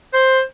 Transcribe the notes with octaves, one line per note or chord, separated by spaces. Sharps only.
C5